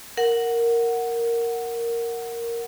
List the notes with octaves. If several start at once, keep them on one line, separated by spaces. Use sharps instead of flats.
A#4 F#5